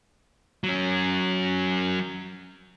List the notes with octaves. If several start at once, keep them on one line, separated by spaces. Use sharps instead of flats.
F#3 C#4